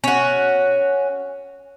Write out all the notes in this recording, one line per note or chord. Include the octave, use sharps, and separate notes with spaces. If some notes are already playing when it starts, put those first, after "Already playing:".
C#4 F#4